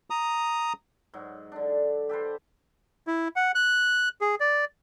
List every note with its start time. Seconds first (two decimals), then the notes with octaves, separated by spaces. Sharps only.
0.10 A#5 D#6
1.13 G#2 F#3
1.52 D3 D4
2.09 G4 A4 B4 C5
3.07 E4
3.36 F#5
3.55 F#6
4.21 G#4
4.40 D5